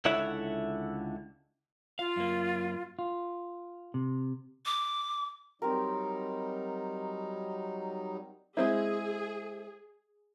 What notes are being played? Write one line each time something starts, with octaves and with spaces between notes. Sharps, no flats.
C#2 D3 E4 C#5 E5 F#5
F4 F5
F#2 A#3
F4
C3
D6
F#3 G3 C4 D#4 G4 A#4
G#3 C4 E4 G#4